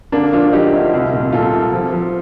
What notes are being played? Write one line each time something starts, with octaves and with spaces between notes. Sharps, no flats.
D3 A#3 D4
F3 D4 F4
F3 D#4 G4
D2
C2
A#2
A#2 F4 A4
C2
F3
F3